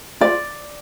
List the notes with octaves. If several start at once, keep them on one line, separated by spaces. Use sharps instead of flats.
F4 D5